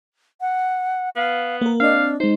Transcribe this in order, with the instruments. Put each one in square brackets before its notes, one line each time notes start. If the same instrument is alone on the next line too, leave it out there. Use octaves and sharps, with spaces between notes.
[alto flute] F#5
[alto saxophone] B3 [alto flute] F5
[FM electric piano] A#3 A#4
[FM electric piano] C4 D#5 [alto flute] D4 [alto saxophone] F5
[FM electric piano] G#3 D#4 [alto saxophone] C5